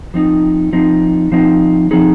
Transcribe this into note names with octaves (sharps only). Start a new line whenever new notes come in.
F3 C4 D#4
F3 C4 D#4
F3 C4 D#4
F3 C4 D#4 G#4